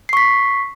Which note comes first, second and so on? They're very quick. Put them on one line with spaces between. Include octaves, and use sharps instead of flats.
C7 C#6 B6